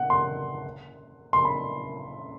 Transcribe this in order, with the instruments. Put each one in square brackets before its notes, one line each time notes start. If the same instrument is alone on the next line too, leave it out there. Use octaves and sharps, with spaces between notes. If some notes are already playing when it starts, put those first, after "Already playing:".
Already playing: [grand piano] F#5
C6
C6
B5